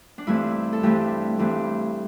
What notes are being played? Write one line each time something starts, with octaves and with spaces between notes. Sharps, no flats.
D4
G2 E3 A3 C4 E4
A4
G2 E3 A3 C4 G4
G2 E3 A3 C4